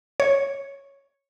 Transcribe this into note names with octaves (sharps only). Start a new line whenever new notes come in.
C#5